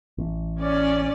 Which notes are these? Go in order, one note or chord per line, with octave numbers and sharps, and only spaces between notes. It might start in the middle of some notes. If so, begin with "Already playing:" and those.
A1
C#4 D5